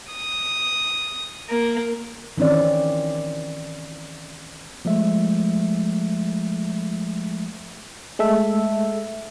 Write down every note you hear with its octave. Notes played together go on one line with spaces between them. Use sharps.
D#6
A#3
D#3 E3 C4 C#4 D5
F3 G#3 A3 E5
G#3 A3 A4 E5